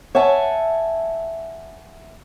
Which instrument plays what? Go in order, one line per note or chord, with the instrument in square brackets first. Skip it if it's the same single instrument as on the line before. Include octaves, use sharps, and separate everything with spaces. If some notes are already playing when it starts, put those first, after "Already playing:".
[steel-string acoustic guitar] C#5 E5 F#5 G#5 A5